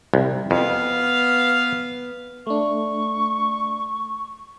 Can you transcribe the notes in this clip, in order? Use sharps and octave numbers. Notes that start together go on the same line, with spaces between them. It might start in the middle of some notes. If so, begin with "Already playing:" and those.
C2
F2 B3 F5
A3 D4 C#6